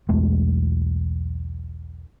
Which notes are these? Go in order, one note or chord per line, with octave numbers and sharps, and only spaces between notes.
B1 E2 G#3 A3